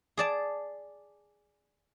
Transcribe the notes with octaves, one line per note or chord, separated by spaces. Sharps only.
G#4 D5 A5